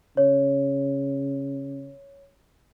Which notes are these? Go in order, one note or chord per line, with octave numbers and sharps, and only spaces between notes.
C#3 C#5